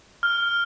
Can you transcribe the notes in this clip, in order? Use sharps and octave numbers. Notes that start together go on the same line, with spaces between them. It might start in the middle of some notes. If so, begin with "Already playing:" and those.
F6